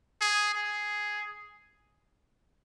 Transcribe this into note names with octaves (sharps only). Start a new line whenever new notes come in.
G#4
G#4